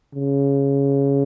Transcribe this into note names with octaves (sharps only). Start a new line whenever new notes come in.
C#3